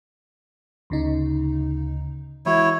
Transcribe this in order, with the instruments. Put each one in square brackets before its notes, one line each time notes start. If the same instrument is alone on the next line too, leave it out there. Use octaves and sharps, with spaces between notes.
[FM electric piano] D2 C#3 D#4
[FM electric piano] E3 G#3 F#4 [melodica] E4 C#5